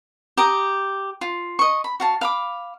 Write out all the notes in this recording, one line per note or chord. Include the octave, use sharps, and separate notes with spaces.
G4 A#5 D6 D#6
F4
D#5 C#6
B5
F#4 F5 A5
F5 B5 D6